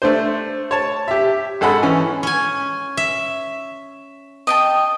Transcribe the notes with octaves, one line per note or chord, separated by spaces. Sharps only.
A3 D4 C5
C#5 A5
G4 E5
G#1 G#4 A4 F#5 B5
E3 C#4
C#4 G#5
E5
D#5 G5 A5